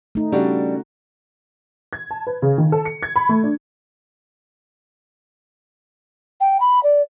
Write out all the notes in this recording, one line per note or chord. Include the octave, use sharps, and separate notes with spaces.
A3 D#4
C#3 G3 D4 F#4 A4
G#6
A5
B4
C#3
D#3
A4
C#7
G#6
B5
A3
D4
G5
B5
D5